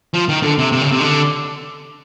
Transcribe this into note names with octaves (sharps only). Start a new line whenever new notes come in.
F3
D#3
D3
C3
C3
C#3
C3
D3